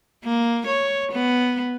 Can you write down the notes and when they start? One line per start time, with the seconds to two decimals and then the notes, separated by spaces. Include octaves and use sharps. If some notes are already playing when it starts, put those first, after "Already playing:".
0.24 A#3
0.66 C#5
1.12 B3